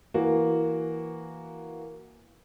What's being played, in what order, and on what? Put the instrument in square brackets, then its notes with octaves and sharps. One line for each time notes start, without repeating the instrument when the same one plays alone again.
[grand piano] E3 A#3 F#4